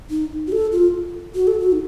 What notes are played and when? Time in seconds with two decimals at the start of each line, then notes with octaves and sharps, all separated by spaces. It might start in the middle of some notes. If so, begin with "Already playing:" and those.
0.10 D#4
0.47 F#4
0.52 A4
0.72 F4
1.35 F#4
1.47 A4
1.60 F#4
1.72 D#4